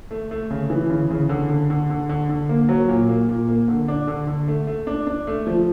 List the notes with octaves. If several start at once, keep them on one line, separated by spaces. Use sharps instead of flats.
A3
A3
C#3
E3
C#3
C#3
D3
D3
D3
D3
D3
D3
A#3
F#3
A#2
A#3
A#2
A#3
D3
D4
D3
D3
A3
A3
D4
D4
A3
F3